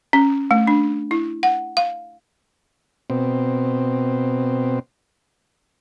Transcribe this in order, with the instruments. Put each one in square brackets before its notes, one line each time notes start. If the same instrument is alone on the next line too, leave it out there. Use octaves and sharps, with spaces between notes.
[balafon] C#4
A3
D4
E4
F#5
F5
[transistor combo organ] B2 C4